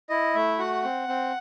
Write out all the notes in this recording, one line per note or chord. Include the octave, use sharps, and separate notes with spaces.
E4 D#5
A3 E5
F#4 F#5
C4
C4